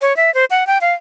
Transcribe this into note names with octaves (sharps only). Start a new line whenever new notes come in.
C#5
E5
C5
F#5
G5
F5